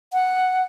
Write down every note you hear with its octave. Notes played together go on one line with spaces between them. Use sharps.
F#5